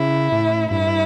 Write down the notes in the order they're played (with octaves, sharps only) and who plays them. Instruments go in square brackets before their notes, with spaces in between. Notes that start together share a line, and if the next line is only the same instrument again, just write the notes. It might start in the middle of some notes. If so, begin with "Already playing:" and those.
Already playing: [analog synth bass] C#3 [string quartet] E4
[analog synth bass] A2
[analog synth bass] G2 [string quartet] E4